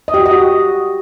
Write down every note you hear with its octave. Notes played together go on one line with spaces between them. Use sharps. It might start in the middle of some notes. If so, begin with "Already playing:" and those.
D#5
G4
F#4
D#5
F#4